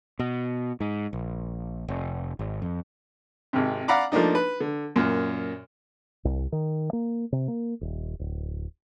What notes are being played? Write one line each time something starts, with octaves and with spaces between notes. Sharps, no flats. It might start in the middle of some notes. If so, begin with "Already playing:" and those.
B2
G#2
A#1
F1
G#1
F2
G#1 C3
D5 F5 F#5 A#5 B5 D6
F3 A3 A#3 D4 D#4
B4
D3
F#2 A#2
C2
D#3
A#3
C3
A#3
D#1
D1